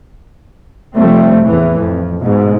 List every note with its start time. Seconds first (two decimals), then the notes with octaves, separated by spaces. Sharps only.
0.95 F1 F3 G3 A3 C4
1.43 E2 A2 E3
1.77 F2
2.22 G#2 B2